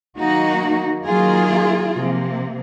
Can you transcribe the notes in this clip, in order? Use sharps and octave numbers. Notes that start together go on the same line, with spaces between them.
D#3 F#3 A#3 D#4 F#4
D#3 F#3 A#3 F4 G#4
C3 F3 A#3